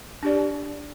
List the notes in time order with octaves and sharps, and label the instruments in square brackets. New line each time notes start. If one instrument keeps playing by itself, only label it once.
[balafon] D4 G4 D5